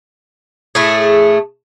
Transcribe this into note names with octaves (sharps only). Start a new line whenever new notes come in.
A2 A3 G#4